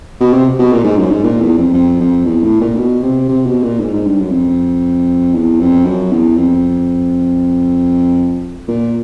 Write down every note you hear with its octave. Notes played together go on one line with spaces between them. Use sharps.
B2
C3
B2
A#2
G#2
F#2
G#2
A#2
E2
F2
F2
F2
E2
A2
A#2
B2
C3
C3
B2
A#2
G#2
G#2
G2
F#2
F2
E2
F2
F#2
E2
F2
A#2